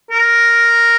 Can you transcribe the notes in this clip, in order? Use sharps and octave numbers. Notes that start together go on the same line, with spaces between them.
A#4